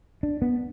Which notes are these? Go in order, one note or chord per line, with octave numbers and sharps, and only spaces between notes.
D4
B3